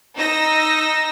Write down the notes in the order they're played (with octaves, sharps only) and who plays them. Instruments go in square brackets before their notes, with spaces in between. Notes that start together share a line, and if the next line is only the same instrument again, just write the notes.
[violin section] D#4 E6 A#6